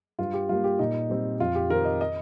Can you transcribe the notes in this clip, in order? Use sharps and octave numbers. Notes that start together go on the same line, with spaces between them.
G2 F4
G4
G3 A#3 F4
G4
A#2 D#4
G3 C4
F2 F4
G4
D#3 C4 A#4
D#5
D#5